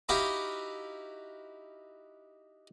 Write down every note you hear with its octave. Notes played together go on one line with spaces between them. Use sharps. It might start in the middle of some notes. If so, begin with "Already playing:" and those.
D#4 E4 F#4 G4 F5 G5